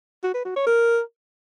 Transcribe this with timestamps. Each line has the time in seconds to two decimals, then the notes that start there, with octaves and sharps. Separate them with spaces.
0.24 F#4
0.34 B4
0.45 F#4
0.56 C#5
0.67 A#4